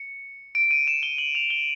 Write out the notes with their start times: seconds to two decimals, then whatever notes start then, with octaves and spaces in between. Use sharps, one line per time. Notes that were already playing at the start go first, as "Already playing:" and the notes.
Already playing: C#7
0.55 D7
0.71 D#7
0.87 E7
1.03 G7
1.18 F#7
1.35 F7
1.50 G7